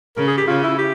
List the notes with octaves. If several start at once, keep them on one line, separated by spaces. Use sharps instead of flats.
C#3 A#4
G#4
G4
C#3 F4
E4
G4